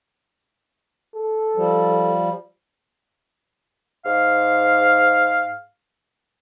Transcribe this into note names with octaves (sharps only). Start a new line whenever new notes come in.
A4
F3 G3
G#2 F5